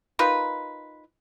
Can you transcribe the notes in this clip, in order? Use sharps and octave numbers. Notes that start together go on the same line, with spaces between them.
D#4 F4 A#4 B4